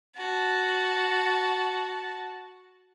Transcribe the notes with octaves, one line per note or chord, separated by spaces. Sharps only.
F#4 A5